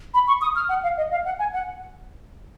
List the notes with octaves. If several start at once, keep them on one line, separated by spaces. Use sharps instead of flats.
B5
C#6
D#6
F6
F#5
F5
D#5
F5
F#5
G#5
F#5